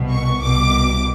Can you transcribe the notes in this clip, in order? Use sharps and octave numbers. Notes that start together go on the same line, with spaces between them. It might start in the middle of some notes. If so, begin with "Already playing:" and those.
Already playing: C2 B2
C#6
C2 B2 D6